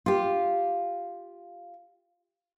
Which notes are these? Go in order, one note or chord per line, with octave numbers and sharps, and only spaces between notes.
F4 G4